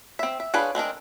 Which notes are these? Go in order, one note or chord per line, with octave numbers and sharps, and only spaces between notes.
C4 E5
E5
D4 F4 G#4 B4 C#5
G#3 C4 D4 A#4